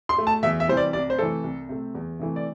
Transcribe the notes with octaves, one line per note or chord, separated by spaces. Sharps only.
C6
A3
A5
E2 E5
E5
C3 E3 G3 C5
D5
C2 D5
C5
C3 E3 A3 A4
C2
C3 A3
E2
C3 E3 A3
D5